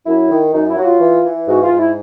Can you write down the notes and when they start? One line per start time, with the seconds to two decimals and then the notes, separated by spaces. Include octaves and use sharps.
0.06 F#2 E4
0.30 D#3
0.53 F#2 D#4
0.70 E4
0.77 F#3 F#4
0.85 F4
1.00 E3
1.24 E3
1.47 G#2 F#4
1.64 F4
1.72 G#2
1.79 E4